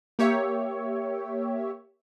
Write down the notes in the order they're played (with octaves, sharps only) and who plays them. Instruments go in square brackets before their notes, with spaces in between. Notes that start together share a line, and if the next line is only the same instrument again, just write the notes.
[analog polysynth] A#3 G4 C#5 E5